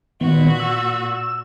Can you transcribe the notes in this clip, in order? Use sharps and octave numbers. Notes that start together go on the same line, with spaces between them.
A#2 D#3 B3 F#4
E6